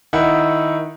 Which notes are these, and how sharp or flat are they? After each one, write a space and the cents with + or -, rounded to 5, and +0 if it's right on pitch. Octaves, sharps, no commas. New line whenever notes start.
D#3 +0 E4 +0 F#5 -10